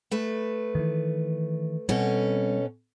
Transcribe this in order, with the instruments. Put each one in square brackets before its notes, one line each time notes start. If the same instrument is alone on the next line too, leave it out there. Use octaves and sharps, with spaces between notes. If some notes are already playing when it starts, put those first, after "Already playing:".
[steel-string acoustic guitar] A3 B4
[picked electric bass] D#3 E3
[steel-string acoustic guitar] B2 C#4 A4 [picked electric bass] G3 G#3 C4